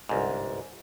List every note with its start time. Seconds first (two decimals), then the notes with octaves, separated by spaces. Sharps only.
0.09 G1 C2 G#2